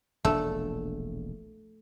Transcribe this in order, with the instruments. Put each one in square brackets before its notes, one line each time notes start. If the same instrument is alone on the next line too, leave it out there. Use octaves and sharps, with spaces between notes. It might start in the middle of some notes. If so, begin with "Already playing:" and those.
[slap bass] E1 A#1 D4 [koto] A3